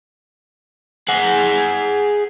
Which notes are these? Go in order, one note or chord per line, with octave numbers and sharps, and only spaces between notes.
G#4 F#5